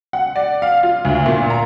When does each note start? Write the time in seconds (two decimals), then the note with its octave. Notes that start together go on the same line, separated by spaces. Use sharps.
0.13 F#5
0.36 D5
0.62 F5
0.83 F4
1.05 D2
1.26 A#2
1.50 A#5